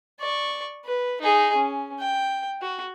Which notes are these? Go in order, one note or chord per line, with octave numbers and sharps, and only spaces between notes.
D5 C#6
B4
D#4 G#4
C#4
G5
F#4